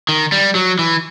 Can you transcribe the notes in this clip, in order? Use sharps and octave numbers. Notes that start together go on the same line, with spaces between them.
D#3
G3
F#3
E3